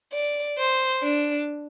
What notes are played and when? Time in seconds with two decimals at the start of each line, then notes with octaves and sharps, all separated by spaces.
0.13 D5
0.58 C5
1.03 D4